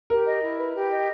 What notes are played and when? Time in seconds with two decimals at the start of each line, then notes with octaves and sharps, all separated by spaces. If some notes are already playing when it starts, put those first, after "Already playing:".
0.10 G4 A#4
0.26 D#5
0.42 E4
0.58 B4
0.74 G4
0.90 D#5